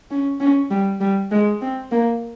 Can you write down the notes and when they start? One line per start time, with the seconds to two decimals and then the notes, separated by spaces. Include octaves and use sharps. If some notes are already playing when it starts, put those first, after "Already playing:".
0.10 C#4
0.40 C#4
0.70 G3
1.00 G3
1.31 G#3
1.61 C4
1.91 A#3